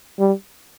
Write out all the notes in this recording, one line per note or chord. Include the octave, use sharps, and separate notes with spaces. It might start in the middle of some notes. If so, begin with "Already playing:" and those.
G3